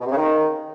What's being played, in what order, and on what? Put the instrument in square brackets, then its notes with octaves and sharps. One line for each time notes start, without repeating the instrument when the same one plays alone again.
[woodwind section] B2
C3
C#3
D#3